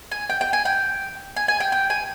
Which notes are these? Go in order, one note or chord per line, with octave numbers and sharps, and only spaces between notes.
G#5
G5
G5
G#5
G5
G#5
G#5
G5
G5
G#5